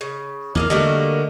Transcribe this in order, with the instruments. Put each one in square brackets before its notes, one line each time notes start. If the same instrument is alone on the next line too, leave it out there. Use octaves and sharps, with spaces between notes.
[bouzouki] C#3
[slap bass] E2 [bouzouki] A#3 D#5 F5
[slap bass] D3 [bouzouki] G3 A#3 F#4 [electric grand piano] A3 D#5